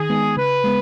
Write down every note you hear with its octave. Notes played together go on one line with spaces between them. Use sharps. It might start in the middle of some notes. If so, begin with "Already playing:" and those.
Already playing: D#3 G#4
G#3 B3 D#4
C#3 B4
G#3 B3